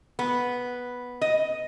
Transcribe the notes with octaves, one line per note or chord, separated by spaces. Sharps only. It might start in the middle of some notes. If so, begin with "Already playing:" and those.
B3
D#5